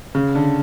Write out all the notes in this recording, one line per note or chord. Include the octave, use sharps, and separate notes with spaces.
C#3
D3